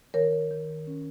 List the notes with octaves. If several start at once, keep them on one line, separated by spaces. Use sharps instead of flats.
D#3 A#4 C#5
D#3
C#4